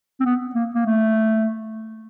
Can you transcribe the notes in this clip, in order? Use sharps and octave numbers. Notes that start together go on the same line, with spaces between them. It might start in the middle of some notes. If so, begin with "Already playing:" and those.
C4
B3
A#3
A#3
A3